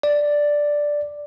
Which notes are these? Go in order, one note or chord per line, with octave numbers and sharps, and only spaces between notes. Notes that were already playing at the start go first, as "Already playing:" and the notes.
D5